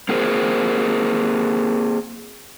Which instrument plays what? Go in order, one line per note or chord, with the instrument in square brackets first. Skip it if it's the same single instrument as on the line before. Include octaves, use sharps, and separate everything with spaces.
[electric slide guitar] A#3 C4 G#4 A#4 C5